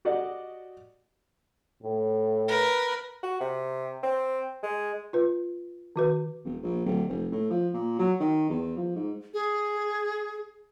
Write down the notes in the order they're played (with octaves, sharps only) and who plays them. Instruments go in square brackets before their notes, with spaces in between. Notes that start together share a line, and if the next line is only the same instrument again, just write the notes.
[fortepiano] F#4 G4 D5 D#5 F#5
[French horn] A2
[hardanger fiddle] A#4 B4
[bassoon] F#4
C3
C4
G#3
[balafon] F4 B4
D#3 F#4 B4
[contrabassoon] E1
A#1
D1
F1
A2
F3
A#2
F#3
D#3
E2
F3
G#2
[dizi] G#4